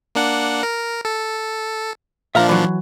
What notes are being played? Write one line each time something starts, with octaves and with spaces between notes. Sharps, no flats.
A#3 D4 F#5
A#4
A4
A#2 F3 D4 E5 F5 A#5
E3 F#3